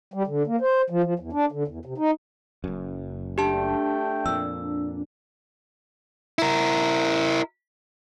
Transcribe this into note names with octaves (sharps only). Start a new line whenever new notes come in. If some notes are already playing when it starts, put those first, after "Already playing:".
G3
D3
A#3
C5
F3
F3
E2
D4
D3
E2
C3
D#4
F#1 F#2
A3 D4 G4 G5 A5
F2 A#2 E6
E4 A#4